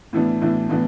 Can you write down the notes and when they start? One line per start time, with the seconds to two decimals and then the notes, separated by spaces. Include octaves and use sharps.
0.13 A2 E3 B3 D4
0.41 A2 E3 B3 D4
0.69 A2 E3 B3 D4